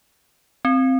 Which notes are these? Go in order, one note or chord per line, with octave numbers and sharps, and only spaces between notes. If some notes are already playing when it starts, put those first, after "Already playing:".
C4